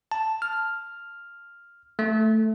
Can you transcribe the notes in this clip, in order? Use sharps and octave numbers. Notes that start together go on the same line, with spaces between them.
A5
F6
A3